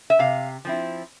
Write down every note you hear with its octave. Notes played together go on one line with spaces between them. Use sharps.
E5
C3 F5
F3 C4 E4